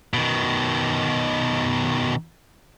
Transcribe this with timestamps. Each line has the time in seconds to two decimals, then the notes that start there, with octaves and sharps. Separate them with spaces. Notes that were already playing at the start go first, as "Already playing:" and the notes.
0.14 B2 D#3